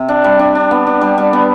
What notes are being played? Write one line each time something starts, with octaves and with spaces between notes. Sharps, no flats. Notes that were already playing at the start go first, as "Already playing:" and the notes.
Already playing: C3
D4
G3
D4
D4
B3
D4
G3
G3
B3